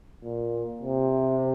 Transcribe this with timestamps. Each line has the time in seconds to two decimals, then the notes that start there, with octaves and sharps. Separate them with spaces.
0.24 A#2
0.82 C3